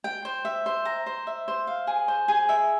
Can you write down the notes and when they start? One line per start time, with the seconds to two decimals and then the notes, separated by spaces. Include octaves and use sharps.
0.04 G5
0.25 C5
0.45 E5
0.66 C5
0.85 A#5
1.06 C5
1.27 E5
1.48 C5
1.67 F5
1.87 G#4
2.08 C5
2.28 G#4
2.49 E5